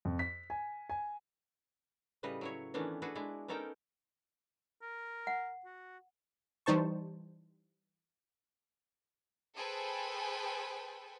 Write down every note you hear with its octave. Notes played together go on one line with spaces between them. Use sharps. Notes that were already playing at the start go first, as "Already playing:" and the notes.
F2
B6
G#5
G#5
A2 C#3 G3 B4 D#5
F#3 E4 C#5
D#3 E3 A3 B3 C#4 D4
D4 F#4 G#4 A4 B4
G#3 D4 E4
B3 C#4 D#4 A4 A#4 G5
A#4
F#5
F#4
E3 G3 D#4 C5 A5 C#6
G#4 A4 B4 C5 G5 G#5